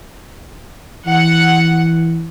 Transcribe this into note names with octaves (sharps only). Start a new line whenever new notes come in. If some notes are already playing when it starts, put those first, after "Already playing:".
E3 F#5